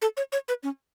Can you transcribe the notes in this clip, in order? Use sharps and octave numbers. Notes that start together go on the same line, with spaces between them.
A4
C#5
C#5
B4
C#4